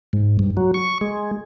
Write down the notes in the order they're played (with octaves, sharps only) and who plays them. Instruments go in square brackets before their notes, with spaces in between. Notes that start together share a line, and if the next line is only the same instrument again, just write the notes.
[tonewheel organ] G#2
G2
F#3
C#6
G#3